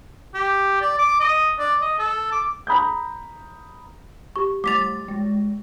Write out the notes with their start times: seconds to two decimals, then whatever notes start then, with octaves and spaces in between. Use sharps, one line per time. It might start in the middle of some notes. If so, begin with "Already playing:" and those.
0.34 G4
0.81 D5
0.99 D6
1.20 D#5
1.59 D5
1.82 D#5
1.99 A4
2.32 D6
2.67 A#5 B5 D#6 G6
4.36 G4 C#6
4.64 G3 A3 D6 A6 B6 F7
5.08 G#3